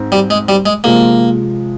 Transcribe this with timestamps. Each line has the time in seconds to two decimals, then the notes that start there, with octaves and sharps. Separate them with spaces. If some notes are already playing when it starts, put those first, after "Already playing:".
Already playing: G#2 C4
0.12 G3
0.30 G#3
0.49 G3
0.66 G#3
0.84 C3 F3 G#3 A#3